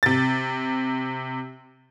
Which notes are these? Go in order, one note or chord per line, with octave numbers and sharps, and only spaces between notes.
C3 A6